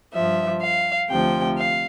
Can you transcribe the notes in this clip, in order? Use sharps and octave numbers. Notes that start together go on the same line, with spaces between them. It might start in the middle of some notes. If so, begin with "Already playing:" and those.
G2 F3 E5
F5
D2 C3 F3 G5
F5